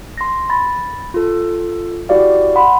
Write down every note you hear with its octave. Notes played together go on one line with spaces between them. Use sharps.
C6 A#6
B5 A6 A#6
F4 A4
E4 F#4 G4 D5 F5
F#5 B5 C6